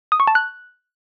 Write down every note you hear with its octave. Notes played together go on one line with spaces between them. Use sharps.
D#6
C#6
A5
F#6